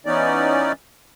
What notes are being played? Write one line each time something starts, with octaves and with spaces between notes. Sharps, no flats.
E3 B3 C#4 D#4 D5